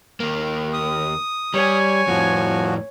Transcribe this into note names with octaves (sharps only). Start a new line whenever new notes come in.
D#2 A#3
D#6
G3 C#5 G#5
F2 A2 F3 F#4